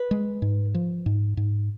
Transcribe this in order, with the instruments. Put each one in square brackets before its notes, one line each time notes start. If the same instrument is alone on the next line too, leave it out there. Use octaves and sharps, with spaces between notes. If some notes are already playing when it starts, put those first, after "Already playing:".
Already playing: [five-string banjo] B4
[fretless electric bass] G#3
G#2
F3
G#2
G#2